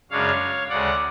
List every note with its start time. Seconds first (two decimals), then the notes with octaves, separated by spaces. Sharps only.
0.11 F#2 C#3 G#3 D4 C#5 F5
0.69 D2 C#3 G#3 D5 F#5